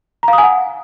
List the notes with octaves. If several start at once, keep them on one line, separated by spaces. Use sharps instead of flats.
A#5
F5
D#6
G#5
F#5